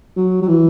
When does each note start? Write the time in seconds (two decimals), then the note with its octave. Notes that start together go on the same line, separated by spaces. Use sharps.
0.17 F#3
0.42 F#3
0.48 E3